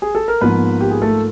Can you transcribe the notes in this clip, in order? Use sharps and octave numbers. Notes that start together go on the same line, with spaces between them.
G#4
A4
A#4
G#2 F3 A#3 B3 B4
G4
G#4
A3 A4